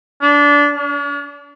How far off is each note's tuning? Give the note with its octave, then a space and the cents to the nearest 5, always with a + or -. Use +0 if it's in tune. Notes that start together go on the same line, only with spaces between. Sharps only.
D4 -20
D4 -45